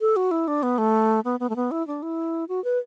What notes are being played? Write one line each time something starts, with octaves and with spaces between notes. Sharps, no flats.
A4
F#4
E4
D4
B3
A3
B3
B3
A3
B3
E4
D4
E4
F#4
B4